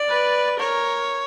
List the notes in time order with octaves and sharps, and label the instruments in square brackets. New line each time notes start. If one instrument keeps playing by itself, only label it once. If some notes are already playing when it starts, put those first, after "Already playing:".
Already playing: [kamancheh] D5
[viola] B4
[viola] A#4 [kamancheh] C#5